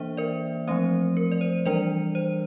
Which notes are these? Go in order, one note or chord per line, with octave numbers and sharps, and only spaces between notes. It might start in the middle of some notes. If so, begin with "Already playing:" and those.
Already playing: E3 A#3 D4 C5 E5
A#4 D5
F3 A3 C4 C5
A#4
D5
C5
E3 G3 D4 A#4 D5
C5